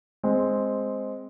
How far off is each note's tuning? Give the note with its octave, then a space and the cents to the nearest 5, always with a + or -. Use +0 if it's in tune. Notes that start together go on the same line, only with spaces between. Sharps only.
G#3 +0 C4 +0